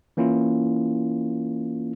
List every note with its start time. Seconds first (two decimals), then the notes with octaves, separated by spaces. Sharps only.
0.17 E3 A#3 C#4 E4 F4